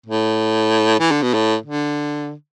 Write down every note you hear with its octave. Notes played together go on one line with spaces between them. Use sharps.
A2
E3
D3
B2
A2
D3